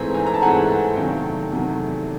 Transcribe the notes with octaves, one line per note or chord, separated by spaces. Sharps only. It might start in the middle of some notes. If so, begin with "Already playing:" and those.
Already playing: G#2 E3 A3 C4 G#5 A#5
G#5 A#5
A#5
A5
G#2 E3 A3 C4 F#5 G#5
E2 C3 D#3 F#3 A3 F5 G5
E2 C3 D#3 F#3 A3